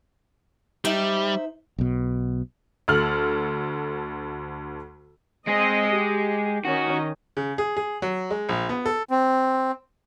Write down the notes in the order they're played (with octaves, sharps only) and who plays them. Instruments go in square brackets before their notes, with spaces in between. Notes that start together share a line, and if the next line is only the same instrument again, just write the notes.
[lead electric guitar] G3 [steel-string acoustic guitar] D#4 C5 E5
[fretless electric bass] B1 B2
[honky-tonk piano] D2 A4 F6 F#7
[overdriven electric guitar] G#3 G#4 [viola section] C4 D#5
[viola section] G4
[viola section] D#3 C#4 D#4 [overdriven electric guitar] F#4
[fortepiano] C#3
G#4
G#4
F#3
G#3
A#1
B3
A4
[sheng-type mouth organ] C4